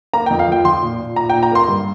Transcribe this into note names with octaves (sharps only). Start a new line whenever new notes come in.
A#3 A#5
G5
F2
F5
F3 G5
F3 C6
A#2
A#2
A#2 A#5
G5
A#2
A#5
A#3 C6
G2